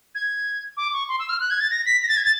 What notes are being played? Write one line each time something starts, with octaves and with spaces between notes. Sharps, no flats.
G#6
D6
C#6
C6
E6
F6
F#6
G#6
A6
A#6
B6
A#6
A6
G#6
A6